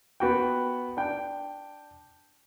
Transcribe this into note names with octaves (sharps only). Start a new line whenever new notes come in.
B3 F#4 G5
D4 G5